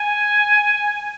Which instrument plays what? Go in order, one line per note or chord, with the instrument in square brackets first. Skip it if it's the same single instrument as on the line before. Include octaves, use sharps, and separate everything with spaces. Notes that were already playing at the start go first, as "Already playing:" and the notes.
Already playing: [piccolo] G#5